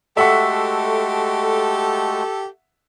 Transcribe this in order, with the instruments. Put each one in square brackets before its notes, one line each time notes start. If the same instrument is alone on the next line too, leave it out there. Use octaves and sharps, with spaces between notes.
[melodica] G#3 A3 F#4 [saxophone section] G4 A4 [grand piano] E5 F#5 C#6